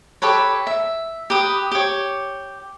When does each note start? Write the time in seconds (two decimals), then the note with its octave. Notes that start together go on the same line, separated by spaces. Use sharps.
0.22 G4 A4 B4 C#5
0.67 E5
1.30 G4 B4 D#6
1.72 G4 C#5